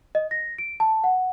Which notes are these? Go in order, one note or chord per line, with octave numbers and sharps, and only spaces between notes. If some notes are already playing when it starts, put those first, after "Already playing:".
D#5
A#6
D7
A5
F#5